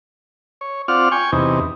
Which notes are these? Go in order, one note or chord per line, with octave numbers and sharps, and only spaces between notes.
C#5
C4 F4 D5 F#5 F6
G5 G#5 C#6
E2 C3 D#4